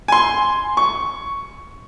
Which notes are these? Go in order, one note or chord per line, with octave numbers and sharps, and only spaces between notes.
G#5 C6
C#6